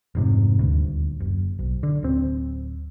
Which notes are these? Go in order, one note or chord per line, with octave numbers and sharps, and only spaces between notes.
F1 G#2 C3
D#1 D2
F#1
B1
D3
D1 C4